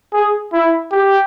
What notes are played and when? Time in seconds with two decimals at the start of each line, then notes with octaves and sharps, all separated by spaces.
0.13 G#4
0.53 E4
0.92 G4